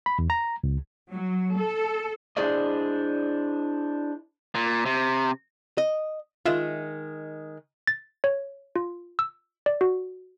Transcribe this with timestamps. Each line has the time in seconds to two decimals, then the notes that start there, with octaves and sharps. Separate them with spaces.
0.06 B5
0.19 E2
0.30 A#5
0.64 C#2
1.10 F#3
1.57 A4
2.37 D4 E4 G#4 C5 D5 D#5
4.55 A#2
4.86 C3
5.78 D#5
6.45 D#3 G#3 F4 E5 E7
7.87 A6
8.24 C#5
8.76 F4
9.19 E6
9.66 D5
9.81 F#4